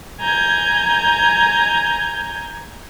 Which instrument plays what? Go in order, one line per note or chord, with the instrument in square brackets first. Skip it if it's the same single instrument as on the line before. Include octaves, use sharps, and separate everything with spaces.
[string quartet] G#5 A#5 G6 G#6